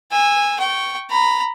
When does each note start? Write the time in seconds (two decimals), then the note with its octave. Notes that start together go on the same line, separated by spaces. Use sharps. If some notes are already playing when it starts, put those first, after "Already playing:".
0.11 G#5 E6
0.59 G5 C#6
1.10 A#5 B5